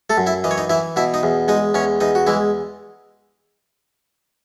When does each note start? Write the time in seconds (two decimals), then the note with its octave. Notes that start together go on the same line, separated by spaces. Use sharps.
0.10 A3 A4
0.17 F#2
0.26 E4 E5
0.44 E3 D#5
0.51 C#5
0.58 D#4 D#5
0.70 E3 E4 E5
0.96 B2 E4 E5
1.14 D#4 D#5
1.23 E2
1.48 G#3 D#4 D#5
1.74 E2 C#4 C#5
2.00 E2 D#4 D#5
2.15 F#4
2.27 E3 G#3 E4